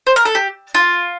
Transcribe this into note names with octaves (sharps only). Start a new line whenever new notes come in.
C5
A#4
A4
G4
F4